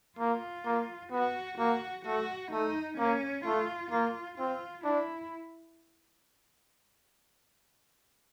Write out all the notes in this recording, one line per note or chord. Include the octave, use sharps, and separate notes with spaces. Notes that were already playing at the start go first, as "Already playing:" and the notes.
A#3 F4
A#3
B3 F#4
A#3 F#4
A3 F#4
A3 D#4
A#3 C#4
A3 F4
A#3 F4
C4 F4
D4 E4